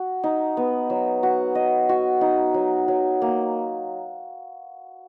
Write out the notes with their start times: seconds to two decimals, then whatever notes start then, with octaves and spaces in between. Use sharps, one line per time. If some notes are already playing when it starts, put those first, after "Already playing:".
Already playing: F#4
0.23 D#4
0.57 B3
0.90 F#3
1.23 F#4
1.55 D#5
1.89 F#4
2.21 D#4
2.54 F#3
2.88 F#3
3.22 A#3